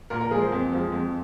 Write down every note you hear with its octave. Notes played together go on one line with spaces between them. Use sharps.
A#2 A#4
A#4
F3 G#3 G#4
C5
F2
F3 G#3
F2